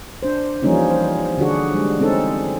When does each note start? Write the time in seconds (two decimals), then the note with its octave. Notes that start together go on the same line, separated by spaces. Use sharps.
0.23 D4 C5
0.63 E3 F3 G3 A#3 C#4 D#4
0.90 C5
1.38 D3 D4 F#4 G#4
1.74 G3 G#3
1.99 G#3 C4 C#4 D#4 A4